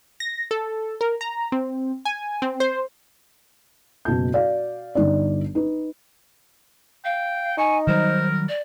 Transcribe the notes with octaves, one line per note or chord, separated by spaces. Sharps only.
A#6
A4
A#4
A#5
C4
G#5
C4
C5
F#1 B2 A5 G6
F#4 D5 F5
G1 D#4 D5
D#4 B4
F5 G5
D#4 G#5 C#6
D#3 F#3 G3 A#4 C5
D5